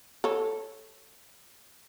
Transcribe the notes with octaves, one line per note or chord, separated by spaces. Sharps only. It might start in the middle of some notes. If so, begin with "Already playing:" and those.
A4 C#5